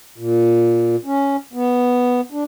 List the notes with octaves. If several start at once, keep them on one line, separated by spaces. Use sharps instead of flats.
A#2
C#4
B3
D4